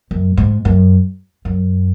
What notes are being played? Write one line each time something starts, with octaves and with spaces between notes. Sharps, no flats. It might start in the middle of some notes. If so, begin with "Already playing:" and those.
F#2
G#2
F#2
F#2